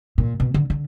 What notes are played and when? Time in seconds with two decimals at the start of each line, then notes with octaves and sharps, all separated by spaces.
0.18 A#2
0.40 B2
0.54 D3
0.70 D3